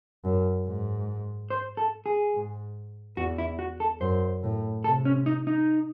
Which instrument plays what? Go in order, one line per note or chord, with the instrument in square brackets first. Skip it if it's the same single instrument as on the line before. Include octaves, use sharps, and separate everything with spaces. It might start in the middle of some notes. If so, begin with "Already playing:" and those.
[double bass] F#2
G#2
[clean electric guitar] C5
A4
G#4
[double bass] G#2
[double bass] E2 [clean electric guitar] F#4
[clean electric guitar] E4
F#4
A4
[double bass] F#2 [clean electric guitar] C5
[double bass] A2
[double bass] C3 [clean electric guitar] A4
[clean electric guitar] C#4
D#4
D#4